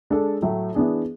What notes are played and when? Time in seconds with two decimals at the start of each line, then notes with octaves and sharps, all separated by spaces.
0.10 G#3 D4 A4
0.42 A2 F#3 A3
0.75 E3 B3 D4 G#4